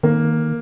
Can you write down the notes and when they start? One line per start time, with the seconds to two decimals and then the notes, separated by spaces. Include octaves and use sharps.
0.03 D#3 A#3